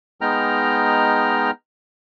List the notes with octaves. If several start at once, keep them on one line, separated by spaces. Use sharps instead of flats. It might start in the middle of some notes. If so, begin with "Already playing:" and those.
G#3 B3 D#4 G5 A#5 F6